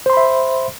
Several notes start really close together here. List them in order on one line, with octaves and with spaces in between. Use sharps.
C5 C6 B5 E5